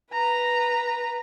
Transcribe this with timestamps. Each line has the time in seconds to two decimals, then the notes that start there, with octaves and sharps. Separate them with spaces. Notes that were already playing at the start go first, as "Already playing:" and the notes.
0.12 B4 A#5